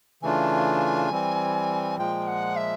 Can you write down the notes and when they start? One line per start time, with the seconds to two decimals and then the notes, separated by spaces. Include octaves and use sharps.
0.22 C#3 E3 A3 D4 F4 G#5
1.10 E3 G3 C4
1.97 A#2 F3 G#3 G5
2.27 F#5
2.56 E5